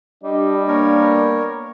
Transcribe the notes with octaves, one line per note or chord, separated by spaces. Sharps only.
G3 D4 G4 D#5
A#3 B3 A#4 C#5